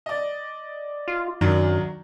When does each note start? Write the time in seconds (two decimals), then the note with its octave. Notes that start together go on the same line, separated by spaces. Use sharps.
0.06 D5 D#5
1.08 F4
1.41 F#2 D#3 F#3 D4